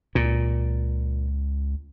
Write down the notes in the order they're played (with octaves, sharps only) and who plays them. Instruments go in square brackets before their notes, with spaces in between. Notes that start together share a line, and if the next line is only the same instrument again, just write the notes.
[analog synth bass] C#2 [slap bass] A#2